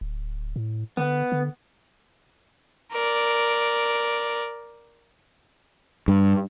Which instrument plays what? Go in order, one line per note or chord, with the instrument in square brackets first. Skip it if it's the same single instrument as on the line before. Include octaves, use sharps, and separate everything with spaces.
[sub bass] D1
A2
[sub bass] D3 [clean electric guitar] B3
[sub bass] D3
[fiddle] A#4 D5
[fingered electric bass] G2